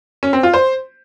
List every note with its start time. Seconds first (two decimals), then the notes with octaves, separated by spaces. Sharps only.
0.23 C#4
0.33 C4
0.43 F4
0.54 C5